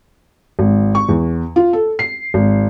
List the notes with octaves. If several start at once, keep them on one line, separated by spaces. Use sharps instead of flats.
G#1
C#6
E2
F4
A4
C7
G#1